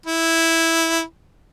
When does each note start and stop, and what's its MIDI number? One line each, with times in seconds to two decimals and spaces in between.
0.06 1.01 64